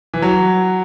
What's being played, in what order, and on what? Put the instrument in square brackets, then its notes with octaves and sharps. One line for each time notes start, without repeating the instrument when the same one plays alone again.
[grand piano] E3
F#3